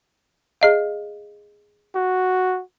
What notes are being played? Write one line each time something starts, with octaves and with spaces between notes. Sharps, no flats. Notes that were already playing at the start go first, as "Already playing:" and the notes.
G#4 D#5 F5
F#4